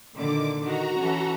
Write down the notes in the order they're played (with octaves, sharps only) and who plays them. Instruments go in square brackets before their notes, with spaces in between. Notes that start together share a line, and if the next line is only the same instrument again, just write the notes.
[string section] A#2 D3 D#3 [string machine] D6
[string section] D#3 [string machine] F#4 A#5
[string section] E3 C#4 A4